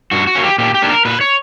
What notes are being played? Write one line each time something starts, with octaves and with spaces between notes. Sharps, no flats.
G2 F#4
F#4
F#3 A#3 C#4
G4
A#2 G4
G4
A#3 D4
A#4
A#2 B4
C#5